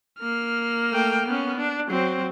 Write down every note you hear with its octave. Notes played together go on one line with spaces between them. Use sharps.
A#3 F6
A3 G5
B3 C#4
D4
F#3 C4